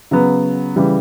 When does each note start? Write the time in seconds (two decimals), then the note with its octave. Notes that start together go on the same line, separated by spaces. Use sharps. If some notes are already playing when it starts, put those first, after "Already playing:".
0.11 C#3 F#3 B3
0.76 C#3 E3 G3